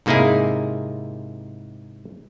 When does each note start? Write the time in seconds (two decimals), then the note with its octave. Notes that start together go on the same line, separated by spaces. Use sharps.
0.06 G#2 C3 A#3 D#4 E4 G#4